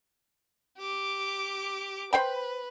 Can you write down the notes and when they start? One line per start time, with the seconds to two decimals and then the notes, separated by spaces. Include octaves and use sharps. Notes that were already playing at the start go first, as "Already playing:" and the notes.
0.78 G4 D6
2.13 B4 C5 G5 B5